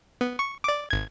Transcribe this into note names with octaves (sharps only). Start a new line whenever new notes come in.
B3
C#6
D5 D6
G#1 G#6